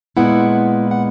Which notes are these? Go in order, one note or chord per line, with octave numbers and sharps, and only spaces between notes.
A#2 G#3 B3 E4 F#5
F#5